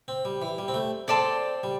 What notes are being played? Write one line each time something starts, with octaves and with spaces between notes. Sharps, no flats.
C4
G3
E3
G3
C4
A3
C4 A4 D5 A5 C6
G3